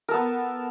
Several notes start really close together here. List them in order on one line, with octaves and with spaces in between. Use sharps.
A#4 A4 B3